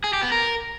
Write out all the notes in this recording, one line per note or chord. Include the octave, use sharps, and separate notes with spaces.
G#4
G4
B3
A#4